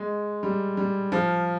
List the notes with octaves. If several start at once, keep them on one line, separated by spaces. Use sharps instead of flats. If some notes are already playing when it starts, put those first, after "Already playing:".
Already playing: G#3
G3
G3
F3